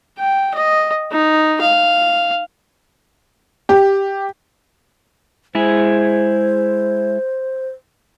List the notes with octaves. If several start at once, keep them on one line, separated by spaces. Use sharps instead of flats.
G5
D#5
D#4
F5
G4
G#3 E4 G#4 C5